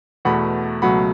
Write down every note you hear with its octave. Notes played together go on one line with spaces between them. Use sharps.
E2 B2 A3 F#5 B5
C#2 B2 F#3 A3 F#5 B5